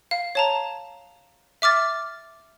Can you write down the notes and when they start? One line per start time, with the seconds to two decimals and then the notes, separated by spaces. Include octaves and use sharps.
0.11 F5
0.35 C#5 A5 A#5
1.62 E5 D6 F6 A6